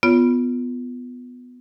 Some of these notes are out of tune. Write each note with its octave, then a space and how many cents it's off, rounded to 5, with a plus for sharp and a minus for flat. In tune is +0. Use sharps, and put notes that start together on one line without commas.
B3 +10 F4 +0 C#5 +30